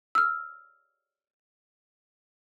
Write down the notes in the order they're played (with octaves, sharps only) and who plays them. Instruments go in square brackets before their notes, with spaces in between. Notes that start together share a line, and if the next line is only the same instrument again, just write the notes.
[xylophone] E6 F6